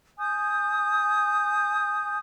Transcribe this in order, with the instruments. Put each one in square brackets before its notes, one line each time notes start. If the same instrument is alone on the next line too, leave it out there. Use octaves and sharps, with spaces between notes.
[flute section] G#5 D#6 G6